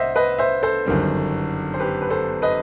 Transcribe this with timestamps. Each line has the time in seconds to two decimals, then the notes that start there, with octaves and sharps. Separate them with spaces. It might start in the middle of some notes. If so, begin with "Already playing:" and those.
Already playing: C2 C5 D#5 E5 F#5
0.16 B4 D#5
0.38 C5 E5
0.63 A4 C5
0.86 G1 F#2 D#3 G3
1.74 C5
1.80 G4 B4
2.02 B4
2.10 A4 C5
2.42 B4 D#5